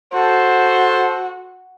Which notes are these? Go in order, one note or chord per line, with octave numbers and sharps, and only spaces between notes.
F#4 A4 C5